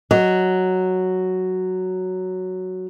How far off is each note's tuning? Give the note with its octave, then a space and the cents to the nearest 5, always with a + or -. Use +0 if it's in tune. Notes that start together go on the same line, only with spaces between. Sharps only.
F#3 +0 D#5 +0